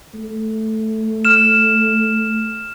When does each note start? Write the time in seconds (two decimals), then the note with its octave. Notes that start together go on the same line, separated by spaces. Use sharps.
0.14 A3
1.25 F6 E7